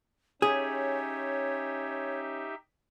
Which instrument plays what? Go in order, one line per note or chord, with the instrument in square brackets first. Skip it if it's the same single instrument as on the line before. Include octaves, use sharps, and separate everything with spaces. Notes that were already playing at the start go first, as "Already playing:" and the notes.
[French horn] C#4 [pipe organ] D#4 G4 E5 [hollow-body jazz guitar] G#4 [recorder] C#5